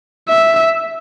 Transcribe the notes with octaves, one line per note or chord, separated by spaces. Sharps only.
E5